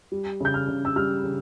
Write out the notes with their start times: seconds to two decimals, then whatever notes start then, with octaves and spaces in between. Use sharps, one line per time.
0.12 G3
0.41 C#3 G6
0.54 F6
0.68 C#3
0.85 E6
0.96 G3 F6
1.24 C#3